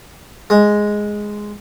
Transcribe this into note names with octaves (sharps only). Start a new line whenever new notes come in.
G#3